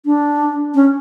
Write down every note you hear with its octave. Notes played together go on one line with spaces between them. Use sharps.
D4
C#4